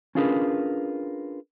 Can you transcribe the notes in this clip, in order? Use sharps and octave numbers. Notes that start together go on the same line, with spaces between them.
C#4 D4 F4 G#4 A#4 B4